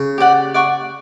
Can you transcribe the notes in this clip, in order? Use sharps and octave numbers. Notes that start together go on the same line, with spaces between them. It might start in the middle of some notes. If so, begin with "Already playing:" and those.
Already playing: C#3
G4 D5 F#5
D5 F#5 C#6